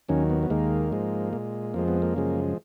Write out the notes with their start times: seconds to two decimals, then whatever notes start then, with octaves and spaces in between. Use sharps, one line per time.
0.09 D#2 D#3 F#3 C#4
0.30 B3
0.43 B3
0.50 D#2 D#3 G#3 A#3
0.92 G#2 F3 G#3
1.33 A#2 G#3
1.74 F2 F3 G#3 A#3
1.88 B3
2.02 A#3
2.16 F#2 C#3 F3 G#3